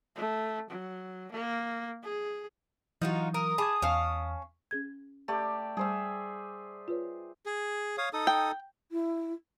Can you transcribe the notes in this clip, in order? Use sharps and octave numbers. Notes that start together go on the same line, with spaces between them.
A3
F#3
A#3
G#4
E3 F#3 D#4 F4 F#4
A#4 D#6
G#4 A5 B5 D6 G#6
E2 C#4 F5 A5 C#6
C#4 G#4 G#6
A3 G4 D5
G3 G#4 C5 E5
F4 B4 C#5
G#4
C#5 F5 D#6
D#4 A4 D#6
G5
E4